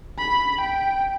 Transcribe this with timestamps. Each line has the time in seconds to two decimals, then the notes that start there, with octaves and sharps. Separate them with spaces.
0.18 B5
0.61 G5